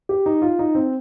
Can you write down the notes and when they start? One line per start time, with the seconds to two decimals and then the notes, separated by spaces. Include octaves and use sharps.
0.09 G4
0.26 D#4
0.42 F4
0.59 D#4
0.75 C4